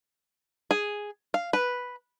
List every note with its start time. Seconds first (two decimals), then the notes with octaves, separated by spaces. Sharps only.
0.71 G#4
1.34 F5
1.53 B4